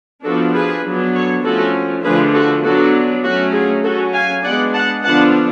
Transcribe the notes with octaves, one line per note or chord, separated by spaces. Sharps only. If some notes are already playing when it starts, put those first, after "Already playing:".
F3 B3 D4 F#4 A4
G#4 B4
F#3 B3 D4
A4 C#5
F3 A3 C#4 F#4 A4
D3 F3 A3 D4 G#4 B4
F#4 A4
F#3 B3 D4 F#4 A4
F#3 A3 C#4 F#4
F4 G#4
F#3 C#4 F#4 A4
F5 G#5
G#3 B3 D4 D5 F#5
F#5 A5
D3 F3 B3 D4 F#5 A5